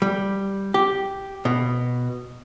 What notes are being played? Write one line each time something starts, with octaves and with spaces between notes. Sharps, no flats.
G3
G4
B2